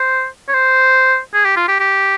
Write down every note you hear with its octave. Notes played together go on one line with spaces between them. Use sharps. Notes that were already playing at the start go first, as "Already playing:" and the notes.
Already playing: C5
C#5
C5
G#4
G4
F4
G4
G4